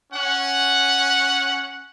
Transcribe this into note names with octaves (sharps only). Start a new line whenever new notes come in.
C#4 F#5